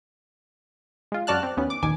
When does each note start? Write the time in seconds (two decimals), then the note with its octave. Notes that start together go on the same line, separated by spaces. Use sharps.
1.12 G#3 F4
1.27 F#2 F#4 D5 A5 F6 F#6
1.43 C4
1.57 D#2 B3 C#4
1.70 D6
1.83 A#1 D#2 A#2 D#3 G#5 D6